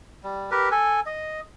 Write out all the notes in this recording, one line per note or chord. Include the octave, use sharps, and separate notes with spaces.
G3
G4 A#4 B4
A4 G#5
D#5